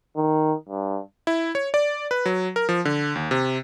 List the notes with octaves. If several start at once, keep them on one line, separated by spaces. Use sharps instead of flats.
D#3
G2
E4
C#5
D5
B4
F#3
A#4
F3
D3
D#2
C3